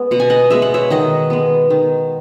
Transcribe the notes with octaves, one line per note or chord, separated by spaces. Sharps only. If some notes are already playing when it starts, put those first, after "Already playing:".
Already playing: G#3 B3
B2 F#5
G#5
D#5 F#5
G#3 B3 E5
F#5
C#5 E5
D#3 D#5 F#5
G#3 B3
D#3